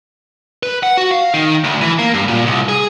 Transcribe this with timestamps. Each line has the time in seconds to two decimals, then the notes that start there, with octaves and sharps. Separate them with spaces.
0.63 B4
0.83 F#5
0.97 F#4
1.11 F5
1.34 D#3
1.64 D2
1.81 E3
1.99 A#3
2.14 G2
2.28 A#2
2.46 C2
2.68 G#4